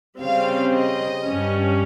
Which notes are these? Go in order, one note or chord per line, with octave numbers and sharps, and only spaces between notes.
C#3 G3 C4 F5
D#5
G2 G3 C#4